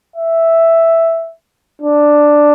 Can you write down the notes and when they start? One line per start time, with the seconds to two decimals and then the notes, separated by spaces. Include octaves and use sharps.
0.16 E5
1.82 D4